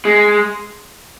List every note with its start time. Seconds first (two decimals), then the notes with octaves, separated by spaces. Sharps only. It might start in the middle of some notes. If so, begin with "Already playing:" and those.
0.05 G#3